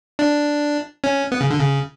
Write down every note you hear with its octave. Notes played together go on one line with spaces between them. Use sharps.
D4
C#4
B3
C#3
D3
C#3